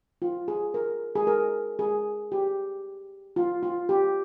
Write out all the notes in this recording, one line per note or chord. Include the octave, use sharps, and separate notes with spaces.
F4
G#4
A#4
G#4
A#4
G#4
G4
F4
F4
G4